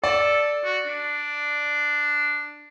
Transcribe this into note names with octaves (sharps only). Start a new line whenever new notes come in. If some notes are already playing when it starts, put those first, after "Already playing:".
A4 D5
F#4
D4